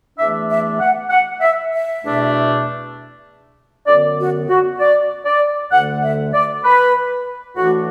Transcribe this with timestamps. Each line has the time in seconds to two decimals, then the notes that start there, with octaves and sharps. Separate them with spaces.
0.18 E2 E3 A3 D4 E5
0.49 E5
0.80 F#5
1.10 F#5
1.41 E5
1.72 E5
2.03 E2 B2 A3 D4
3.87 F#2 D3 B3 D5
4.18 F#4
4.48 F#4
4.79 D5
5.25 D5
5.72 D2 D3 A3 F#5
6.02 E5
6.33 D5
6.64 B4
7.56 A2 E3 A3 D4 F#4